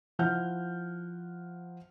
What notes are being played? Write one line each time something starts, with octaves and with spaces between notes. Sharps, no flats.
F3 E4 F#5 F6 G6